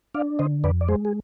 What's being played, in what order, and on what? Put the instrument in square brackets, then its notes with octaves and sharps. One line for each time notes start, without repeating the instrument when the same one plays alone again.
[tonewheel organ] D4 D5 F5
D3 C5 D#5
F2 B4 D5
D5
G#3 G#4 C5
G#4